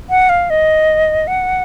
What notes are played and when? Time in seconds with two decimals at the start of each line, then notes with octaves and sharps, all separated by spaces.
0.10 F#5
0.29 F5
0.50 D#5
1.27 F#5